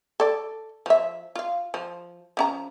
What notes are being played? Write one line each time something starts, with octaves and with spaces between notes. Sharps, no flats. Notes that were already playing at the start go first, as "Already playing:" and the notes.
A4 D5
F3 E5
F4 F5
F3
F3 C#4 A#5